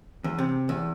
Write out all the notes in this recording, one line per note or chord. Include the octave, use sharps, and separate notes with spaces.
E2
C3
E2